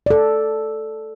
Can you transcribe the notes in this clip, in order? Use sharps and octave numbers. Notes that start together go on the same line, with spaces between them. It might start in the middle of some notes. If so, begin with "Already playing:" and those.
A4 D5